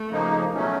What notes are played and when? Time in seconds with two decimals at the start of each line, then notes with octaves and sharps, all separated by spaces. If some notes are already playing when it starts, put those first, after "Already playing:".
Already playing: A3
0.08 C#3 F3 A#3 D#4
0.53 B2 F#3 A3 C#4